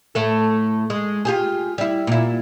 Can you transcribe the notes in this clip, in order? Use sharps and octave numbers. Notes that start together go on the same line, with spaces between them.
A2 A3 A4
G#3
F4 G4 G#4
G3 E4
A#2 E4